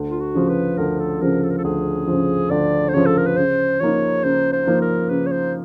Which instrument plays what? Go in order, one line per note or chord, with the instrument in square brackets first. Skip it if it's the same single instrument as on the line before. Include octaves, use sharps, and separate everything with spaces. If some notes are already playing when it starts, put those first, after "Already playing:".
Already playing: [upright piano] D2
[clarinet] F4
F#4
[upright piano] C#3 F3
[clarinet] B4
[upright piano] D2 [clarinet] A#4
[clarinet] A4
[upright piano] C#3 F3 [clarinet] A#4
[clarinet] A4
A#4
A4
[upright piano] D2 [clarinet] G#4
[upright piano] C#3 F3
[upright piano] D2 [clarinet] D5
[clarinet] C5
[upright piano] C#3 F3 [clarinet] C#5
[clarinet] A4
A#4
B4
[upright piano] C#3 [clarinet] C5
[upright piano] F3 A#3 D#4 [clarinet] C#5
[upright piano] C#3 [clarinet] C5
[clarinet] C5
[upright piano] F3 A#3 D#4
[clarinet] A#4
[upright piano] C#3 [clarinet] B4
[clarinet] C#5
C5